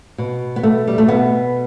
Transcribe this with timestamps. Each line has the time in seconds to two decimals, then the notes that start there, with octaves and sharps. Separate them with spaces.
0.18 B2
0.56 B3
0.63 A3
0.87 G3
0.98 A3
1.08 B2 B3